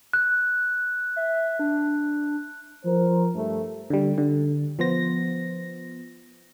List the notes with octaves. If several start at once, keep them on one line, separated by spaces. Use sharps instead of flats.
F#6
E5
D4
F3 A#4 C5
G2 A3
D3 G3
D3
F3 B3 C5 A#6